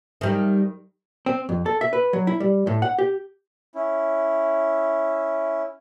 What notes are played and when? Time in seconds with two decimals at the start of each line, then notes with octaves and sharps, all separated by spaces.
0.21 D#3 G3
1.26 C4
1.49 F2
1.66 A4
1.81 E5
1.93 B4
2.13 F#3
2.27 E4
2.40 G3
2.67 A2
2.82 F#5
2.99 G4
3.74 C#4 E4